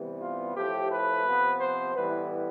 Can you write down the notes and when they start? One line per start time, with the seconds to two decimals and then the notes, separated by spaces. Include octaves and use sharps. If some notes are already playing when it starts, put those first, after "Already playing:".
Already playing: C3 E3 G3 B3
0.20 F4
0.55 A2 F3 A3 G4
0.90 B4
1.25 C3 F3 B3
1.59 C5
1.94 A2 E3 G3 B3 B4